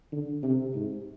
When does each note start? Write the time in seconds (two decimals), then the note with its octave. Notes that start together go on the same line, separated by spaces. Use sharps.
0.12 D3
0.43 C3
0.75 G#2